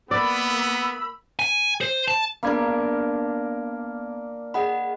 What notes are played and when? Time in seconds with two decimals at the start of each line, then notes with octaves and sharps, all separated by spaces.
0.11 A#3 B3 D5 B5 E6
1.39 G#5
1.81 C5
2.08 A5
2.43 A#3 B3 D4 A#4 B5 G#6
4.54 G#4 D#5 F#5 B5